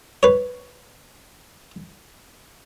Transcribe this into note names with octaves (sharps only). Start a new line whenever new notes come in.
B4 C#5